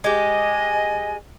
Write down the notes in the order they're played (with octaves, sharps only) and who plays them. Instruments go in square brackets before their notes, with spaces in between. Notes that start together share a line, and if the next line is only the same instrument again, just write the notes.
[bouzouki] G#3 G4 [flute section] D#5 G#5